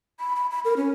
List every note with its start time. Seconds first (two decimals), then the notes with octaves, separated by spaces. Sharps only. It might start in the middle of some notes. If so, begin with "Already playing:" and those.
0.20 B5
0.36 B5
0.51 B5
0.65 A#4
0.77 C#4